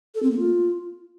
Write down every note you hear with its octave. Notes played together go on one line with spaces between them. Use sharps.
A4
C4
A#3
F4